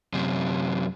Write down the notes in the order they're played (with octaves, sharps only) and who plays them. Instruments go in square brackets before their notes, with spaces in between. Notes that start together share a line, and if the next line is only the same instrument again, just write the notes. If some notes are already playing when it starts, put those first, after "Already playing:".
[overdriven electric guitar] F#2 C3